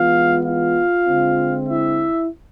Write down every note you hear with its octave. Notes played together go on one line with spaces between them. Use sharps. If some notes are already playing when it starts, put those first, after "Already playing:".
Already playing: E3 G#3 B3 F4 F5
F4 F5
D3 G#3 C4
E4 E5